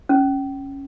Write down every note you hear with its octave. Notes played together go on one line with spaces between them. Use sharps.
C#4